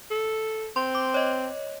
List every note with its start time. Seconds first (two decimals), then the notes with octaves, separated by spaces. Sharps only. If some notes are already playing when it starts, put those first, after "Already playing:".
0.11 A4
0.76 C4 C6
0.95 D6
1.14 C#5 D#5